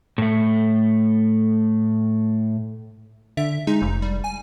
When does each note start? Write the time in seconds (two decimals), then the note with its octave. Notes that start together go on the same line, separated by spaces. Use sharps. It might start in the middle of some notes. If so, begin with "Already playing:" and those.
0.18 A2 A3
3.37 D3 E5
3.67 G#3 D#4
3.82 F1
4.02 G3
4.24 G#5